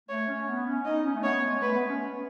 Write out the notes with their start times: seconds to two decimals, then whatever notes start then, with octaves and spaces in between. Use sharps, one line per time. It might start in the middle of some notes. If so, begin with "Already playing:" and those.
0.09 A3 C#5
0.28 C#4
0.48 B3
0.67 C#4
0.85 D#4 D#5
1.05 C#4
1.15 A3
1.23 B3 C#5
1.43 G#3
1.62 A3 B4
1.74 B3
1.87 C#4